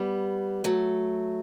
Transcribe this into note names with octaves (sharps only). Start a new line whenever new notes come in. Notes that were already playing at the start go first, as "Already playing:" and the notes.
Already playing: G3 B3
F#3 A3